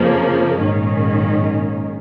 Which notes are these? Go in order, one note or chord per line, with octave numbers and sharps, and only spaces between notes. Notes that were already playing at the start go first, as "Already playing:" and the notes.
Already playing: F2 C#3 F3 A#3
A#1 G#2 D#3 A#3 C#4